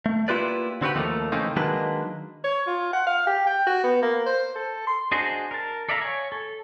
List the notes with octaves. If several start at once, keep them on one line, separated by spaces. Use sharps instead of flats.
A3
A#3 E4 F4 G4 B4 D5
D3 C4 F#4 G4 B4
D#2 F3 A3 A#3
C#3 E3 A3 A#3 C4 D#4
D#3 F#3 G#3 A#3 D4 B4
C#5
F4
F#5
F5
G4
G5
F#4
B3
A#3
C5
A4
C6
D4 F#4 G#4 C5 D#5
A#4 A5
A4 D5 E5 F5 A#5
C#5 G#5
A4